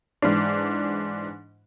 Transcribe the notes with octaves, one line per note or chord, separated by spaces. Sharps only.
G#2 E3 D4